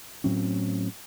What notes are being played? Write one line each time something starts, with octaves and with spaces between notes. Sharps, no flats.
A2 F#3 C4 C#4